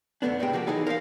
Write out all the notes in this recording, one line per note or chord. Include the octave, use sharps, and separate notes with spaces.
F2 B2 D3 A3 B3 D4
C#2 A2 C3 G#3 G5
F3 A#3 F#4 G4
E3 F#3 D#4 G#4 A4
A#4 C5 D5 F5